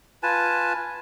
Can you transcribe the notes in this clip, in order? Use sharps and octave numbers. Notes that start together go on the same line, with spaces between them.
F4 B4 G#5 A5